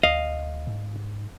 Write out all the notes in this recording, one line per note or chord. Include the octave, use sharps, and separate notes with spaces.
D2 D#5 F5
G#2